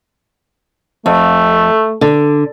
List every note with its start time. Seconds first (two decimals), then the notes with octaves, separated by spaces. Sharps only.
1.06 F2 A3
2.01 D3